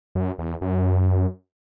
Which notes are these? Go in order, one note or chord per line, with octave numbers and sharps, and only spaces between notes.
F#2
E2
F#2